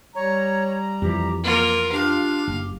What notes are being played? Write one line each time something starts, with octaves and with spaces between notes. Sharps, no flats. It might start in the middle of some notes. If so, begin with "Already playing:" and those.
G3 C#5 A#5
F2 E3 G4
A#3 F4 A#4
D4 F4 G4 F5
F#1 G4